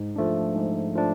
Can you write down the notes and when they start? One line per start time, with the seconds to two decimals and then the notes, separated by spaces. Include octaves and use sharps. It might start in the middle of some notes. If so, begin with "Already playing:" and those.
Already playing: G#2
0.16 F3 A3 D4
0.55 G#2
0.95 F3 A3 D4